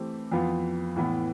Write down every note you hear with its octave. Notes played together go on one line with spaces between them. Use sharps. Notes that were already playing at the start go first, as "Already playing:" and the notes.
Already playing: E3 A3 C4 G4
F2 E3 B3 F4
A2 E3 B3